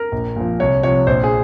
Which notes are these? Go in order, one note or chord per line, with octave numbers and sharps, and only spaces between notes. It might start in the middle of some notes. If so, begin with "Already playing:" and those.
Already playing: A#4
A#1
A#2 F3
C2 C#5
C3 F3 C#5
A#1 C5
G#4